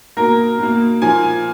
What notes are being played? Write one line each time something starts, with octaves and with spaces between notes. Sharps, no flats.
B2 A#3 A#4
B2 A#3
A#2 F3 A#3 G#5